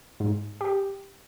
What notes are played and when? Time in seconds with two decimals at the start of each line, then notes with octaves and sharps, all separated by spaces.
0.20 G#2
0.61 G4